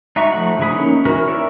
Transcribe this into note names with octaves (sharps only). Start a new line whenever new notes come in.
D#4 F#4 E5 A#5 C#6
F3 A3 F#5
D3 E3 G#4 B5 D#6
A#3 C#4 D#4
E3 F#4 A#4 B4
C#5 D5 E5